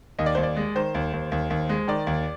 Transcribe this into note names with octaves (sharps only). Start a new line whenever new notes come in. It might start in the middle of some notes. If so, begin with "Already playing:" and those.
D#2 D#5
D5
D#2 C5
D5
G#3
D#3 C5
D#2
D#2
D#2
D#2
G#3
D#3 D5
D#2